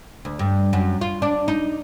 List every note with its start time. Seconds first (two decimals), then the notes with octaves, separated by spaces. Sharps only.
0.25 D2
0.39 G2
0.73 F#2
1.01 F4
1.22 D4
1.48 D#4